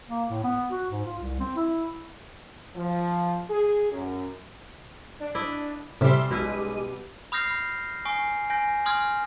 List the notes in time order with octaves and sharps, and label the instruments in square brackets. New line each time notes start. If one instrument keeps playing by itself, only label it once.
[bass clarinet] A#3
A2
B3
F#4
G#2
F4
C2
C4
E4
[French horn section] F3
G#4
F#2
[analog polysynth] D4
[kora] E4 D5 D#5
[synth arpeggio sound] A2 C3 [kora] G3 C#4 [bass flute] G4 [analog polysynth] E5 C6
[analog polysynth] B1 G#3 D#7 [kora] B2 E4
[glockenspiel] B5 D#6 F6 G6 A#6 C7
B5
G#5 C#6 D#6 C7
G#5 G6 A#6
G#5 C6 D#6 F6 G#6